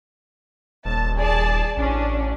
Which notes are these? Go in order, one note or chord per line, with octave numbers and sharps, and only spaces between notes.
D#1 A5
G#4 D5 A5
A1 C#4 D4